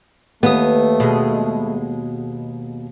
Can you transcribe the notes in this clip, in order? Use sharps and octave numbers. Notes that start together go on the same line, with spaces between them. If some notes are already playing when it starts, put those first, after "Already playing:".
D#2 A3 B3 D#6
B2 G#3